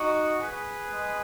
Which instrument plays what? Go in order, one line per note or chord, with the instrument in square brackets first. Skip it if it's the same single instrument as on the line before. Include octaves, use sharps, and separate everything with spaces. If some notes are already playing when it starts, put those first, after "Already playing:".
Already playing: [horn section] D#4 F#4
G#4 B4
G#3